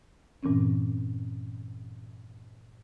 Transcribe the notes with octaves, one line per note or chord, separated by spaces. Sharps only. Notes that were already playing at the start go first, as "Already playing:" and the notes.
G2 A#2 E3 C4 C#4